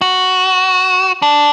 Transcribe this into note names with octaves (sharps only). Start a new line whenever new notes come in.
F#4
D4